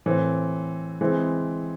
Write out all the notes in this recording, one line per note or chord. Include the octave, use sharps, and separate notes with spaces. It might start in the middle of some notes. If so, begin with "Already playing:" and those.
A2 E3 C4
E3 G#3 C4 E4 G#4